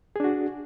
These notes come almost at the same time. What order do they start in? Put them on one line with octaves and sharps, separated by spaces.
G#4 D4 F#4